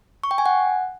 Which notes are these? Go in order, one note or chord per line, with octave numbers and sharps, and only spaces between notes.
C#6
G5
G#5
F#5